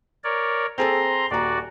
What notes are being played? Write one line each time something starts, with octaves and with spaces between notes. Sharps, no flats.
A#4 C#5 D5
C4 G#4 A4 A#5 C6
D#1 F#4 D5 A#5